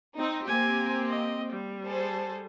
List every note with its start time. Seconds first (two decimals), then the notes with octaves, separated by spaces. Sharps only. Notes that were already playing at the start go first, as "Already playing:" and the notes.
0.18 C4 D#4
0.48 A#3 C4 G4 G#5
1.09 D#5
1.53 G3
1.88 G#4 A4 C5